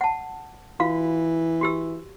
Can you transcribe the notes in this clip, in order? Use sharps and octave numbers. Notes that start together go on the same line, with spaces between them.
F#5 A5
E3 F4 F#4 F5
F#4 G4 E6